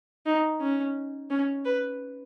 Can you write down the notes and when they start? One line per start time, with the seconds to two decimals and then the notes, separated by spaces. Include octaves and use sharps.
0.26 D#4
0.60 C#4
1.30 C#4
1.65 B4